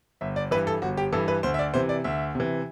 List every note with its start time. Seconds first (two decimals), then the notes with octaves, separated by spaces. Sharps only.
0.21 G1 E5
0.36 D5
0.51 E3 B4
0.54 G2
0.67 A4
0.82 G1 F#4
0.97 G4
1.13 G2 E3 A4
1.28 B4
1.43 D2 C5
1.54 E5
1.59 D5
1.74 C3 E3 C5
1.89 D5
2.04 D2 E5
2.35 C3 E3